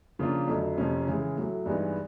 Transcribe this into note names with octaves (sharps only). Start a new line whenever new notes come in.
C#3 F3 A#3 D4 F4
F2 D3 F#3 A3
F2 C3 F3 A#3 C#4
C#3 E3 G#3
A2 F#3 A3
G2 E3 G#3 B3 D#4